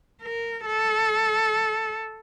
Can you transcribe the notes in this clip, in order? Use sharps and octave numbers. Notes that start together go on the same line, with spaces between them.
A#4
A4